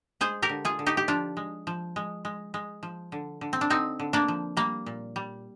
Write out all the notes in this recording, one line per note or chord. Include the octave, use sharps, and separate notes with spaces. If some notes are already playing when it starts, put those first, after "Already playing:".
G#3 G#4 C5
G4 A#4
D3
F4 G#4
D3
D#4 G4
G4
F3 D4 F4
G#3
F3
G#3
G#3
G#3
F3
D3
D3
C4
D4
D3 C4 D#4
D3
A#3 D4
F3
G3 A#3
A#2
G3